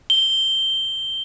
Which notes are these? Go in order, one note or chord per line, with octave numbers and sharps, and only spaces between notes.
G7